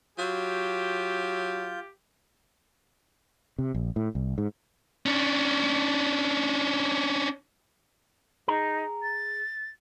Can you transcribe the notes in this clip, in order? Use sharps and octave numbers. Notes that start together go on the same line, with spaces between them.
F#3 F4 G4 G6
C3
A#1
A2
C2
G#2
C#4 D4
D#4 G#4 A#5
A6